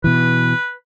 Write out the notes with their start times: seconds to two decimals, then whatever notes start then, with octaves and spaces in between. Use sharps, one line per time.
0.04 B2 E3 B4